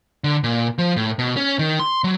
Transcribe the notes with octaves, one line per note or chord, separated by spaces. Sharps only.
D3
A#2
F3
A2
B2
C#4
D#3
C6
F#3